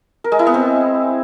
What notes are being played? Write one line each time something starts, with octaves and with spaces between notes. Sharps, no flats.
A#4
G#3
E4
B3
C4